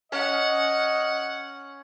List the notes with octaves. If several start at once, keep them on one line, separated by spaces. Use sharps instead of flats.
C#4 D#5 F#5